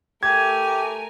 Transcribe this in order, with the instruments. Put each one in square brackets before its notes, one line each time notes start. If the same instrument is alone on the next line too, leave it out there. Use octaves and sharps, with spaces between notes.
[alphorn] A3 [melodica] G4 [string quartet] A#4 G#5 [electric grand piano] G#6